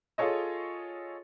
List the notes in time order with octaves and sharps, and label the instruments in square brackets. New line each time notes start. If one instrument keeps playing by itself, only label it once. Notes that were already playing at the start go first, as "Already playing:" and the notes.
[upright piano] F4 G#4 A4 C#5 D#5